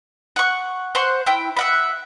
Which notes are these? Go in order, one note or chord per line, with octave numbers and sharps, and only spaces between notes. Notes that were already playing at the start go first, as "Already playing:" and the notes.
F#5 C#6
C5 F#5 C6 C#6
E4 G5
E5 F#5 B5